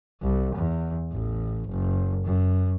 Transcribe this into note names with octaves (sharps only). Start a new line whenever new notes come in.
C2
E2
A1
F#1
F#2